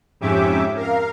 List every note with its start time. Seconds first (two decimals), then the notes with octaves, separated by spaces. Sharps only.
0.21 F2 G#2 C#4 G4 E5 D6
0.76 A#4 F5